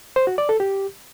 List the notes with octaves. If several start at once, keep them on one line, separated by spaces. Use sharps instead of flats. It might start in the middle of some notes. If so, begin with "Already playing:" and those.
C5
F#4
D5
A4
G4